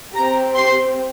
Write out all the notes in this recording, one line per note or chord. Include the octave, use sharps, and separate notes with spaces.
C4 G4 A#5
C6